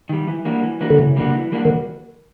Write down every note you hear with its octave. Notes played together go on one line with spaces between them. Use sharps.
D#3 G3
E3
G3 A#3 D4 F#4
E3
G3 A#3 D4 F#4
D3
C#3 E3
G3 A#3 D4 F#4
E3
G3 A#3 D4 F#4
D#3